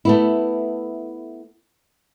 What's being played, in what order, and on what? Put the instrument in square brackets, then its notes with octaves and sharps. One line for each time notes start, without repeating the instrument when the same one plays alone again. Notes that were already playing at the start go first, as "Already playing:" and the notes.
[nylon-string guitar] A3 B3 E4